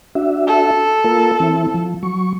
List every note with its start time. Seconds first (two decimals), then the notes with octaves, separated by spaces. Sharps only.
0.15 D4 F#4 E5
0.47 A4
1.05 A#3 F4 A#4
1.40 E3 C4 E4
1.74 F3
2.03 F#3 C#6